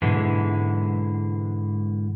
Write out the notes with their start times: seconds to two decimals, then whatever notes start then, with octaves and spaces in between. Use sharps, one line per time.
0.02 G#2 B2 D3 E3 G#3